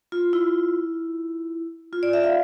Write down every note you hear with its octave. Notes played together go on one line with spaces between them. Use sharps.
F4
E4
F4
D5
E5
F5